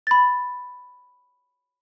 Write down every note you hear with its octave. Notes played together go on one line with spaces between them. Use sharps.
B5 A6